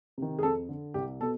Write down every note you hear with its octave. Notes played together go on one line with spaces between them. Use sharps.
C3 D#3
G#4
F2 A4
D3
C2 G4
B2 A4